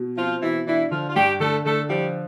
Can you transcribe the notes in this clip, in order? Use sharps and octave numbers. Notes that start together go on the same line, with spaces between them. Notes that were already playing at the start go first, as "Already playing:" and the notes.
Already playing: B2
F3 C4 F4
B2 E3 E4
E3 D4 E4
D3 F3 F4
F4
G2 G3 G4
D3 A3 A4
D3 A3 A4
F3 G3 G4